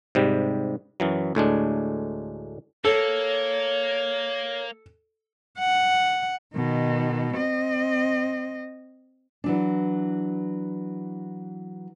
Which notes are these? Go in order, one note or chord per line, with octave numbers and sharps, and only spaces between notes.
G#2 C3 G3
F#2 E3 F#3
D2 A2 G#3 D4
A#3 A4 C#5
F#5
B2 D#3
C4 D#5
E3 F#3 D4